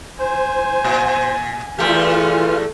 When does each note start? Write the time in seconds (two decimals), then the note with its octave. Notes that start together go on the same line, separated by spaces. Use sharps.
0.19 C5 G#5
0.84 A#2
1.78 E2 E3 A3 F4 G4 F6